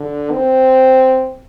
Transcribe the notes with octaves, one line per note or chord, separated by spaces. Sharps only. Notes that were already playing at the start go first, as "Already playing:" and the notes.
Already playing: D3
C4